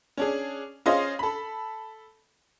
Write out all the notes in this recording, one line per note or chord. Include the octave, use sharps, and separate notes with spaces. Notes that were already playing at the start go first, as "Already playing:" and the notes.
C#4 D4 G#4
C#4 F4 G#4 C5 D#5 F5
A4 B5